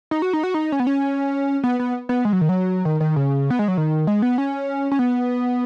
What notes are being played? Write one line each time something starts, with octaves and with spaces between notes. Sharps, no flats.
D#4
F#4
D#4
F#4
D#4
C#4
B3
C#4
B3
B3
B3
G#3
F#3
D#3
F#3
D#3
D#3
C#3
B3
G#3
F#3
D#3
G#3
B3
C#4
C#4
B3